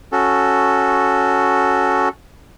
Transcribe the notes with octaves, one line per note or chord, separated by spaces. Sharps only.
C#4 F#4 A4